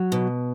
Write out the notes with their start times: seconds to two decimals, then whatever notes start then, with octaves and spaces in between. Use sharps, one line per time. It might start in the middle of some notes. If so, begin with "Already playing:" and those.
Already playing: F#3
0.12 B2